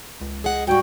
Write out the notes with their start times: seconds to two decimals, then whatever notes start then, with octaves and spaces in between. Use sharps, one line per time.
0.21 C#2
0.44 G#4 D#5 F#5
0.67 G#2 G3 F#4 G5